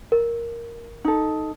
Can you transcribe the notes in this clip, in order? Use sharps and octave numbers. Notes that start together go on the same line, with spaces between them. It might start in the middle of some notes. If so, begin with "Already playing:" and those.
A#4
D#4 A4